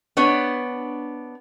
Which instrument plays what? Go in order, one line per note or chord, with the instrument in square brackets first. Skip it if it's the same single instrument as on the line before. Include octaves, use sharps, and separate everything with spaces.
[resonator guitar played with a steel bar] B3 D4 C#5